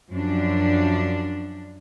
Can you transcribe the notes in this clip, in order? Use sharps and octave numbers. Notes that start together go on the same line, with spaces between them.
F#2 F3 D4